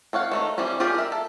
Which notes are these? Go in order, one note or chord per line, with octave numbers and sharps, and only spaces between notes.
C4 C#5 F5 F#5
D#3 A3 A#5
E3 G3 C4 C#4
F4 G4 G#4 A#4 D5
A#4 E5
A4